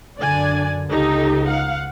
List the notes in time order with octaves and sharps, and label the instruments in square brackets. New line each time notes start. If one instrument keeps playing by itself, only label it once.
[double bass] F#2 D3 [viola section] D4 D5 G#5
[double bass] C#2 [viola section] D#4 G4 A4
[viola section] F5 F#5